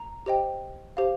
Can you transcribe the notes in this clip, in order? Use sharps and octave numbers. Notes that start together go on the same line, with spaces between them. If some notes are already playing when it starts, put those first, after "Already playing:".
Already playing: A#5
G4 C5 D#5 G5
G4 C5 F5